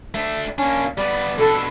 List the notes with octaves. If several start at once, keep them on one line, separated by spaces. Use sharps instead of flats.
A3 D4 E5
A#3 C#4 D4
G3 B3 D5
B2 D4 A4